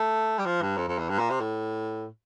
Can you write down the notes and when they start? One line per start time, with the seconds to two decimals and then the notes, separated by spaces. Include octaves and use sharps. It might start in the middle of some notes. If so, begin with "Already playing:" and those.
Already playing: A3
0.39 G3
0.45 F3
0.62 G2
0.77 F2
0.88 F2
0.98 E2
1.09 G2
1.19 A#2
1.30 C3
1.40 A2